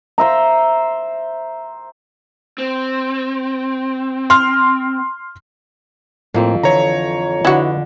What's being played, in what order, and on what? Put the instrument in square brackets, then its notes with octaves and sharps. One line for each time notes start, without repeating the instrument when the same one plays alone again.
[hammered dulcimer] C5 E5 A#5
[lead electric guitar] C4
[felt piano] C6 F6
[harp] F2 [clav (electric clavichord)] A2 A#3 C4
[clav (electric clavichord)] D3 E3 F3 [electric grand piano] C#5 A#5
[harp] D3 [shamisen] E4 F#4 [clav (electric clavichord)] B4 D#5